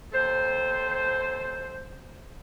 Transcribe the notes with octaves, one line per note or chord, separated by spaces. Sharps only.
D#2 A4 C5